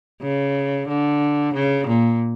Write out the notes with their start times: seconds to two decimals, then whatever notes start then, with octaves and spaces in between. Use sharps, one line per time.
0.22 C#3
0.88 D3
1.54 C#3
1.87 A#2